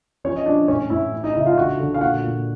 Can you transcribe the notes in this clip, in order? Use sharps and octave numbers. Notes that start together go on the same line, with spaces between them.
F3 C#4 C#5
D#5
F3 D4 D5
A2 C#4 C#5
A2 E4 E5
C#4
D#4 D#5
C#3 E4 E5
F4 F5
D3 F#4 F#5
D3
F5
A#2 F#4 F#5
A#2